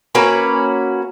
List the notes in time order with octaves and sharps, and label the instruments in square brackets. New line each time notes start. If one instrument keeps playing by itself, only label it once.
[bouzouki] A#3 C#4 F#4 B4